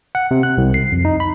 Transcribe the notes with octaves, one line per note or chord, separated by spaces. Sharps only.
F#5
C3
F#6
C2
C7
F2
D#4
B5